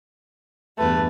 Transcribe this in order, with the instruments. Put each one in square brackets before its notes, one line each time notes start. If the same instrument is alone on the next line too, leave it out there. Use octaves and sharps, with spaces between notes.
[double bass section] E2 G2 E3 [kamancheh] A3 B4